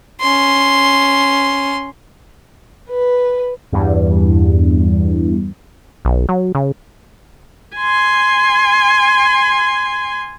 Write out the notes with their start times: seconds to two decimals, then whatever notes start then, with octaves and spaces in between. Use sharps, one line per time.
0.20 C#4 C6
2.91 B4
3.72 E2 G2
6.05 B1
6.29 F#3
6.55 C#3
7.77 G#5 C6